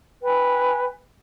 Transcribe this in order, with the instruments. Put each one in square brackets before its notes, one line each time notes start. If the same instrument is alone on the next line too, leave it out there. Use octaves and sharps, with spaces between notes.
[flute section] B4 G5 G#5